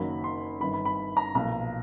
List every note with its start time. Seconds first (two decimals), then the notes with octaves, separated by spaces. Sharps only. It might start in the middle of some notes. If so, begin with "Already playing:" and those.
Already playing: F#1 F#2 D#3 F#3 A#3 B5
0.24 C6
0.61 G1 F#2 D#3 B5
0.74 B5
0.85 B5
1.17 A#5
1.35 B1 A#2 F3 A#5